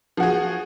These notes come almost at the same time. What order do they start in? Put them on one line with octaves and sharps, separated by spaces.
F3 F#4 G#4